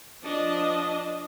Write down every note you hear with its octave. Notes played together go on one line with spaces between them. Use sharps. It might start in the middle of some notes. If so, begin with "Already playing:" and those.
F3 D4 D#5